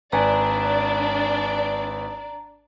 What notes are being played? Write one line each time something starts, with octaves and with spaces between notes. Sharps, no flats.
G#1 D4 B4 D5 G#5 A#5